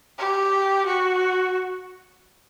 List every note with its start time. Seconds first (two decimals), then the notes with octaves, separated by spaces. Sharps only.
0.18 G4
0.86 F#4